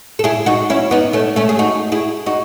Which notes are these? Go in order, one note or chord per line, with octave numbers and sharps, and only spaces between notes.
A4
E4 G#4
D#4 F#4
C#4 E4
B3 D#4
A3 C#4
A3 C#4
G#4
D#4 F#4
E4 G#4
D#4 F#4